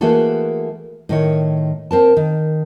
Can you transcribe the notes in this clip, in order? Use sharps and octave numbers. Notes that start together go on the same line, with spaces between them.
E3 A3 A#3 F#4 G#4 A4
A2 D#3 C#5
C4 A#4 A5
D#3